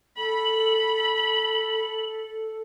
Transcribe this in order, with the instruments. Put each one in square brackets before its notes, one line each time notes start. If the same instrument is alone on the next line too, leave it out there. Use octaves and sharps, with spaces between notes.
[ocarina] A4 [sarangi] B5 [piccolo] F#7